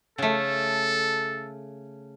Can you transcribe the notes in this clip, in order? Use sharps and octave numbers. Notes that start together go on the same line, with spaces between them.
C#3 A3 A4